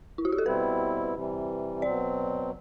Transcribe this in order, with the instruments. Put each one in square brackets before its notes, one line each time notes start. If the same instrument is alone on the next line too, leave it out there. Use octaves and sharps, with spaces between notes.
[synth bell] E4
F#4
G4
A4
[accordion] B2 G3 C4 E4 [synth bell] B4
[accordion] C3 E3 G3
[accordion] B2 F#3 C4 [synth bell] D5